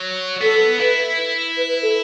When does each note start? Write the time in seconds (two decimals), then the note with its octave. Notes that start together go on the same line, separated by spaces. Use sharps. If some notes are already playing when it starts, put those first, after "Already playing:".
Already playing: F#3
0.41 B3 A4
0.80 E4 B4
1.56 B4
1.69 B4
1.82 A4